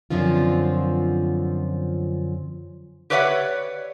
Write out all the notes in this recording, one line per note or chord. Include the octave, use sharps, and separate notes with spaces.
F#2 A2 D3 F3 C4 F4
G4 B4 C#5 D5 E5 F#5